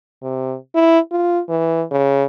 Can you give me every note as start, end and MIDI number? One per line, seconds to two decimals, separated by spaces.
0.23 0.55 48
0.75 0.99 64
1.12 1.41 65
1.49 1.83 52
1.91 2.26 49